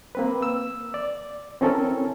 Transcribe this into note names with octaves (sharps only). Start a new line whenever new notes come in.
A#3 C4 B4
E6
D5
C4 C#4 E4 A4 A#4